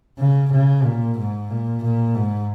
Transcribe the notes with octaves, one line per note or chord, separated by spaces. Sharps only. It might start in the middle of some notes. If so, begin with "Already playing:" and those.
C#3
C#3
A#2
G#2
A#2
A#2
G#2